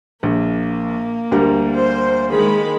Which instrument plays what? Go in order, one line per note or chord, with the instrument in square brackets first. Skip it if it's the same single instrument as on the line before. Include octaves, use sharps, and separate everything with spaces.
[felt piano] A#1 [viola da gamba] A#3
[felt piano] D2 G3 A#4
[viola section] C5
D#3 G#3 B5